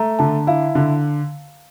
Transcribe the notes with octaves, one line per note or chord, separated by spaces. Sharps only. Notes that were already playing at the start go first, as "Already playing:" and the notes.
Already playing: A3 A#5
D3 A5
E4 F5
D3